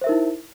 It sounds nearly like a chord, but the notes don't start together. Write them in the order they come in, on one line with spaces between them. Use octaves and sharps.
C5 E5 A#4 D#4 E4